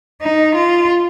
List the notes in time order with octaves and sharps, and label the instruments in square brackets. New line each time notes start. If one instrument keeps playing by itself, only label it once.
[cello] D#4
F4